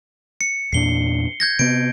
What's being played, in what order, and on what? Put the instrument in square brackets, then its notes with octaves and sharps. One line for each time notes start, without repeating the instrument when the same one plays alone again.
[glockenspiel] C#7
[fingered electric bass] E2 A#2 D4 [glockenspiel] C7 G7
[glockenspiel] G6 G#6 A#6
[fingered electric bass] C3 B3 [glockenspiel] D7